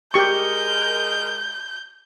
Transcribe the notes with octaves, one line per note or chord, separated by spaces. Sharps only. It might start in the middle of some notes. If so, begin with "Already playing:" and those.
G#3 G4 A#4 C#6 G6